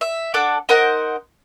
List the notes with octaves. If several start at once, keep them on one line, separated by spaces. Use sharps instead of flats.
E5
D4 A4 F#5 D6
D#4 A#4 C5 F#5